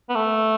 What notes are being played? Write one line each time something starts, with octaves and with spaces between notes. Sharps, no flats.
B3
A3